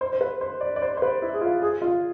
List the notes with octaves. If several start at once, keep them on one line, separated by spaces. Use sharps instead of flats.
C5
C5
B4
C5
D5
D5
C5
C5
B4
E4
G#4
F4
G#4
F4